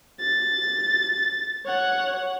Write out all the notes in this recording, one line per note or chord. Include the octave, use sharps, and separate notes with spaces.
A6
C#5 F#5